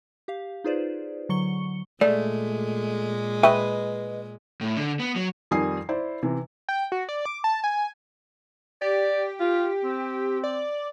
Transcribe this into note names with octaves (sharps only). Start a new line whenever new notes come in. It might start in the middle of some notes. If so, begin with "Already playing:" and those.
G4 F5
D#4 F4 G#4 B4 C5 D5
D3 F#3 C#6 C#7 G7
A#2 G#3 A3 D5
B4 D#5 E5 G5 C#6
A2
D3
B3
F#3
F2 D#3 G3 G#5 D#6 C7
E4 C5 D5
C3 E3
G5
F#4
D5
D6
A5
G#5
G4 D5
F4
C4
D5